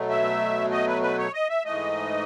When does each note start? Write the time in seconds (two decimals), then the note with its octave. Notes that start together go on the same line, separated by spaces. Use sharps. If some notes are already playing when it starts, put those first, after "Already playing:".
Already playing: B2 F#3 A3
0.10 E5
0.72 D#5
0.88 B4
1.02 B4
1.18 C#5
1.34 D#5
1.49 E5
1.65 G#2 E3 A3 D#5